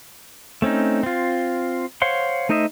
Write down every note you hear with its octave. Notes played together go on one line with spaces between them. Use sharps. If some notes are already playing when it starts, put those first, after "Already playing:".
A3 C4 C#4 D#4
C4 F4
C5 C#5 F5 F#5 C6
A3 D#4 C5 D#5 E5